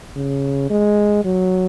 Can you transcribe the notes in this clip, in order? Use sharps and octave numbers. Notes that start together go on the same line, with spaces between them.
C#3
G#3
F#3